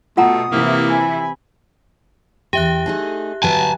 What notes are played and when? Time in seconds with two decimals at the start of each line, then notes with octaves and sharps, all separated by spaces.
0.17 B2 A3 F4 F#5 A#5 D#6
0.52 C3 E3 A#3 E4
0.89 G#5 B5
2.53 E2 G4 E5 G5 F#6
2.86 A3 D#4 G#4
3.43 D2 F#3 B4 G#5 A5